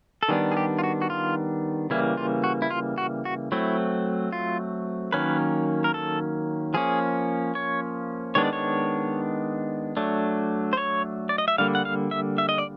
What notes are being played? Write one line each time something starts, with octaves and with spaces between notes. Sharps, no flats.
A4
D#3 G3 B3 D4 G#4
G#4
G4
F4
F#4
F#4
F4
C#3 E3 G3 A#3 E4
F4
F#4
E4
F4
F#4
F#4
F#3 A3 C4 E4
F4
D#3 F#3 A#3 C#4 B4
A#4
A4
F3 A#3 C#4 G#4
C#5
D#3 G#3 B3 D4 C#5
D5
C#5
F#3 A3 D4
C5
C#5
D5
D#5
E5
D3 G3 A#3 F5
F#5
F5
E5
E5
D#5
D5